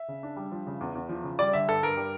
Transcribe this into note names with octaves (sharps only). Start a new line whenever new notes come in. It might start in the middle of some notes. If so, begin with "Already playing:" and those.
Already playing: E5
C#3
D4
G3
F3
C#3
E2
E2
F3
C#3
G3 D5
D3 E5
G2 A4
G2 A#4
G3